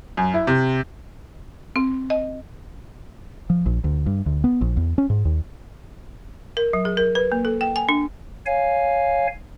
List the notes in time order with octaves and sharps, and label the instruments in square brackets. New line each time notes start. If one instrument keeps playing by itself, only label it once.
[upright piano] F#2
E4
C3
[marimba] C4
D#5
[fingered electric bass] F3
A#1
D2
G2
D2
B3
A#1
E2
C#4
G#2
D#2
[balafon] A#4
F#3
G#4
A#4
B4
A#3
A4
G5
G#5
D4
[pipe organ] C#5 F5 G#5